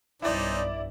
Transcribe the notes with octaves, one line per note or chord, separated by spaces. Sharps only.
B1 G2 C#4 D#4 E4 C5 D5